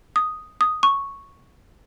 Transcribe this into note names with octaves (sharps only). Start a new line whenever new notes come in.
D#6
D#6
C#6